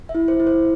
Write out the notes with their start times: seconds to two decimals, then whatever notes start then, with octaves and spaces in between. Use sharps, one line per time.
0.09 E5
0.15 E4
0.28 C5
0.40 E4
0.47 C5